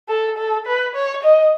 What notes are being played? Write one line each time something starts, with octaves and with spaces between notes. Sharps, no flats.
A4
A4
B4
C#5
D#5